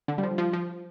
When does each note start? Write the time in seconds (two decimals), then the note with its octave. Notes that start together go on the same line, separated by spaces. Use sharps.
0.08 D3
0.18 G3
0.23 F3
0.38 F3
0.53 F3